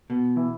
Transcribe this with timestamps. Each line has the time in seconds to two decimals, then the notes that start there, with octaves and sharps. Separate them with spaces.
0.10 B2
0.36 E3 E4